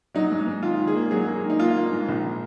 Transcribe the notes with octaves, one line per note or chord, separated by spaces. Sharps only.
F#3 D#4
G#2
G#2
D#3 F4
D#3
G#4
A#3
F#3 G#4
A#3
D#3
D#4
A#3 F4
A#3
G#2
A#1